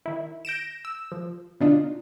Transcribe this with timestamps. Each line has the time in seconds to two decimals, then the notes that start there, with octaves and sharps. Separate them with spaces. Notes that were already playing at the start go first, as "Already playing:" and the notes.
0.06 D#3 E4
0.45 G6 A#6 D7 E7
0.85 E6
1.12 F3
1.60 B2 D3 D4 D#4 F4